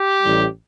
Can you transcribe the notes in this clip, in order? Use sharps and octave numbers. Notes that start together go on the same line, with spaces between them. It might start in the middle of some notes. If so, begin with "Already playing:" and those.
Already playing: G4
A1 A2 G3